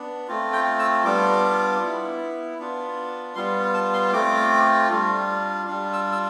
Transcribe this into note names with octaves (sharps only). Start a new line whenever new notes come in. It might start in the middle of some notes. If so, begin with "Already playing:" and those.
Already playing: B3 D4
A3 C4 F4
G5
E6
G3 B3 D4 F4 D6
B3 E4
B3 D4 F4
G3 B3 F4 C6
A5
C6
A3 C4 F4 D6
G3 D4 F4
G3 D4 F4
E6
E6